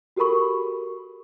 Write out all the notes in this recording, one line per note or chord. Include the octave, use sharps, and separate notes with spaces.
F#4 G4 A4 A#4 B5 C#6